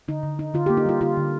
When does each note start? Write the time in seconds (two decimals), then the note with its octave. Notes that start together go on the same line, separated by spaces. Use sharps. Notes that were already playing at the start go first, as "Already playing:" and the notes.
0.08 D3 D#4
0.23 D3
0.39 D#4
0.54 D3 F4
0.66 A#3 G4
0.77 D#4
0.86 G3 F4
1.01 D3 F4
1.17 D3